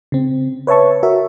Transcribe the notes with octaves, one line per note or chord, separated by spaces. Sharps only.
C#3 C4
B4 C#5 E5 A5 C#6
F#4 A#4 E5